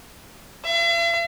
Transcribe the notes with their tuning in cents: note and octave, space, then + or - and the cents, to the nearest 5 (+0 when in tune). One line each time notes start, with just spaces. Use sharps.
E5 +45